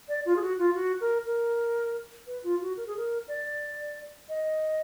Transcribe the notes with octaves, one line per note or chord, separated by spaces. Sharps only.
D5
F4
G#4
F#4
F4
F#4
A#4
A#4
B4
F4
F#4
A#4
G#4
A#4
D5
D#5